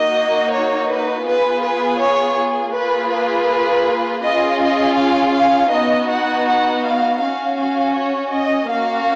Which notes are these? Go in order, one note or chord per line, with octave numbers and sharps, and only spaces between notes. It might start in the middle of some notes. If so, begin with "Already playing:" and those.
Already playing: A#3 D#4 F#4 D#5
C#5
B4
B3 F4 G#4 B4
B4
C#5
A#3 F4 G#4 B4
B4
C#4 F4 G#4 D#5
D#5
F5
F5
B3 D#4 F#4 D#5
F#5
F#5
F5
C#4 F#4 F5
F5
C#5
D#5
A#3 C#4 F#4 F5